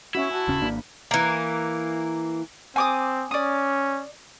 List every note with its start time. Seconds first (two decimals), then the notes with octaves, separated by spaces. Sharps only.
0.15 C#4 E4 F#4 E5
0.31 F#4 C5 G#5 A5
0.48 D#1 C#3 C#4
0.62 G#1 A#3 D4 B5
1.11 E3 A#3
2.76 C4 G#5 D6 D#6
3.31 C#4 D5 D#6